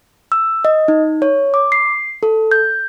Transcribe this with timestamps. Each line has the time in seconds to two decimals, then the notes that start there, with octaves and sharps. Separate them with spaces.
0.32 E6
0.65 D#5
0.88 D#4
1.22 C#5
1.54 D6
1.72 C7
2.23 A4
2.52 G6